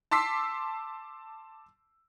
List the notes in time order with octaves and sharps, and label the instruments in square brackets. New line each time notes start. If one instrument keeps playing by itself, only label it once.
[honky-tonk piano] A5 C6 D6 E6 B6 C7